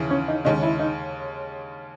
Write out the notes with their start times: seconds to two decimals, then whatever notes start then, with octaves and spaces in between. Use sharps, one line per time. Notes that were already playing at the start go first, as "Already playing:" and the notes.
Already playing: D#2 C#3 E3
0.10 C#4
0.28 D#4
0.45 D#2 C#3 G#3 D#4
0.62 E4
0.79 D#4